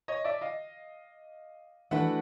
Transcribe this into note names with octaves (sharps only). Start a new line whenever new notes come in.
C#5 D#5
D5 E5
D#5 F5
E3 A3 D4 F#4 B4 E5 F#5